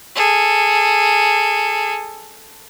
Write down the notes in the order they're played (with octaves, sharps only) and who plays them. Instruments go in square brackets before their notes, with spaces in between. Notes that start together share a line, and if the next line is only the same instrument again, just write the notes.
[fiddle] G#4 A4